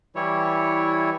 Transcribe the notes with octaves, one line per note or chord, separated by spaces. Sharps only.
E3 G3 E4 C#5